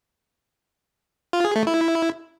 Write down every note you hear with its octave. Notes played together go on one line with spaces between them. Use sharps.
F4
G#4
A3
E4